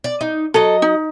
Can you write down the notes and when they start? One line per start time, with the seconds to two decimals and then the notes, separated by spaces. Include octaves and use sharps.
0.04 D5
0.21 D#4
0.54 F#3 A4 D#5
0.82 D#4